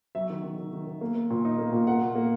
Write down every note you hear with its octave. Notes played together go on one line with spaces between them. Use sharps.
F#3 E5
D#3
D#3
D#3
D#3
D#3
A#3
A#3
A#2
D#4
A#3
A#2
A#3 F#5
A#2
A#3